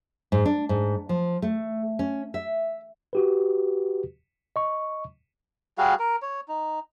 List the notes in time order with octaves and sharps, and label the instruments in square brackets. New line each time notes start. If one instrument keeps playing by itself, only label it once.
[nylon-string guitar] G#2
D4
G#2
F3
A3
C#4
E5
[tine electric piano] F#4 G4 B4
D#5 C#6
[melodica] G3 F#4 G#4 F5
A#4
C#5
D#4